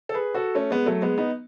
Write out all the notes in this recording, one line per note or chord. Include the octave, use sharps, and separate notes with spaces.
A4
G#4 B4
F#4 A4
A3 C#4
G#3 B3
F#3 A3
G#3 B3
B3 D#4